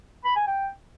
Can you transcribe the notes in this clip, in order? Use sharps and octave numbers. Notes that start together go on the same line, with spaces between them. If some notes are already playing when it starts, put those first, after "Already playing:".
B5
G#5
G5